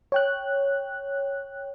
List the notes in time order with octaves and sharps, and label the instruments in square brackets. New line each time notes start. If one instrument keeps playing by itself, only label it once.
[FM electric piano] C#5 G5 F#6